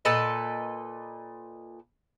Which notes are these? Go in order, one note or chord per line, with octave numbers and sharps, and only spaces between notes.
A#2 A4 B4 D#5